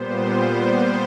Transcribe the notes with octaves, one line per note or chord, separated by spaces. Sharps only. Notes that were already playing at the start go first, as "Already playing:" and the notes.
Already playing: A#2 G3 B3 C5